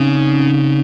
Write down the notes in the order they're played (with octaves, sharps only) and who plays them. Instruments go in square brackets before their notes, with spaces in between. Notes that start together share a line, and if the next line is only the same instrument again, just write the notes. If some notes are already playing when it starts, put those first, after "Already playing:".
Already playing: [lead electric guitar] C#3 [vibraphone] C4 C#4 D#4
[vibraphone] D#4